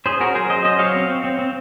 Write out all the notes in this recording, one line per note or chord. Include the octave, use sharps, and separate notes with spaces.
C#4 G#4 C5
C#4 F#4 A#4
F#3 G#4 C5
F#3 C5 D#5
C#4 C5 D#5
F#3 C#5 F5
C4
C4
C4
C4